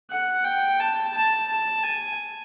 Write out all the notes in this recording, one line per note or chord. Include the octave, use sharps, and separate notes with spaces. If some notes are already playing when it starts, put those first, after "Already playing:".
F#5
G5
A5
A5
A5
G#5